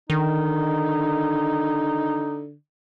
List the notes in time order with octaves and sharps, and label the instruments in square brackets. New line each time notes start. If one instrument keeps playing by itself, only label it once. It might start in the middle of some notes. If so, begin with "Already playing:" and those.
[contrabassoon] D3 [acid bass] D#3 [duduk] D#4